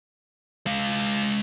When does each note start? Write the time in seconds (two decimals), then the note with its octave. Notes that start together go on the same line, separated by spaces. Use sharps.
0.66 G#3 F5